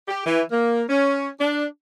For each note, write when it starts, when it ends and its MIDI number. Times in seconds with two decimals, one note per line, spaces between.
0.08 0.23 67
0.25 0.41 52
0.51 0.83 58
0.89 1.28 61
1.39 1.65 62